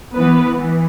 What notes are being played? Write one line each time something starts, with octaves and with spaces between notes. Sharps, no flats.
E3 B3 B4
E3